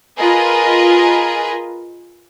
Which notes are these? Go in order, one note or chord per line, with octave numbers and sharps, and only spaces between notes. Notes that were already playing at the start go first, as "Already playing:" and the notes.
F4 G#4 A#4 B4 D#5